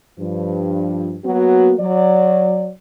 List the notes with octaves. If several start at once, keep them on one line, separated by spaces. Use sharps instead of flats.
G2 F3
F#3 A#3 B3 F#4
F#3 D5